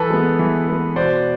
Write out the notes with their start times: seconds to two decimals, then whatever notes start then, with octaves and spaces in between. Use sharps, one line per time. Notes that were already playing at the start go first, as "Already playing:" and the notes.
Already playing: E3 A4 B4
0.10 G#3 B3
0.39 E3
0.68 G#3 B3
0.96 B2 C5 D5